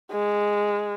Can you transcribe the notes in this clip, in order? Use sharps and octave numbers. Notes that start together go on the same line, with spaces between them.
G#3